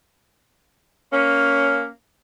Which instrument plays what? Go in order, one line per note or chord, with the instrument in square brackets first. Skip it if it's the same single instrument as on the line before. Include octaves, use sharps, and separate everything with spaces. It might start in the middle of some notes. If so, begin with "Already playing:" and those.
[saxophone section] A#3 C#4